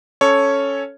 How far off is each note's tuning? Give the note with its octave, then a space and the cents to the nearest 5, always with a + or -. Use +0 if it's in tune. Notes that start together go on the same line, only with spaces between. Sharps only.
C#4 +0 A4 +0 C#5 +0